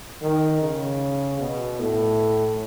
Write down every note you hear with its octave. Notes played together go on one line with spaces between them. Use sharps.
D#3
C#3
B2
A2